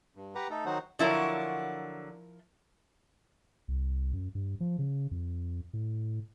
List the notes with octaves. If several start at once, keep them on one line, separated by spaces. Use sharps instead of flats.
G2
G4 B4 F#5 A#5
A3 D#4 A4
D#3 F#3 D#4 F#4 C5 F#5
D3 F3 F#3 E4 A#4
C2
F#2
G2
F3
C#3
F2
A2